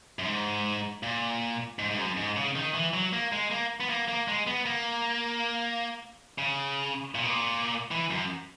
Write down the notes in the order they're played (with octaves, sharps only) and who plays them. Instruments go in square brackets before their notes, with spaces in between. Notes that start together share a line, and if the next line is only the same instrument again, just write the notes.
[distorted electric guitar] F#2
G#2
A#2
G#2
G#2
F#2
G#2
C#3
D#3
E3
F#3
A#3
G#3
A#3
B3
A#3
A#3
G#3
B3
A#3
C#3
A#2
B2
A#2
E3
F#2